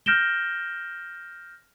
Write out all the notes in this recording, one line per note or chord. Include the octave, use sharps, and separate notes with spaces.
F6 G6 A#6 D7 E7 G7